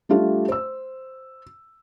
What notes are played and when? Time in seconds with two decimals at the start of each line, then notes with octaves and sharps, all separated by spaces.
0.09 G3 A3 D4 F4 G4
0.48 C5 E6